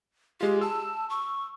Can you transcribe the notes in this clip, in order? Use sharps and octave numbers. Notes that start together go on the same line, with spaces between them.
G#3 F4 G4
A5 E6
C#6